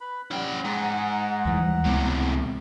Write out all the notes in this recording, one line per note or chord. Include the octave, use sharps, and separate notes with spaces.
B4 B5
G3 C#4 F#5 G5
G#2 F#5 A#5
D#2 E3 G3
C#2 A2 C3 G#3 B3